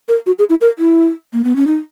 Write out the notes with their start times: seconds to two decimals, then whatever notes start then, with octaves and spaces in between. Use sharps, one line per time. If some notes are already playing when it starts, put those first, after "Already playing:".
0.09 A#4
0.26 F#4
0.39 G#4
0.50 E4
0.61 A#4
0.79 E4
1.33 A#3
1.44 B3
1.56 C#4
1.67 D#4